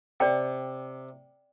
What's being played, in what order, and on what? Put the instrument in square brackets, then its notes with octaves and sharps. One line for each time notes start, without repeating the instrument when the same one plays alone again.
[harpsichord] C3 [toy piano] D5 G5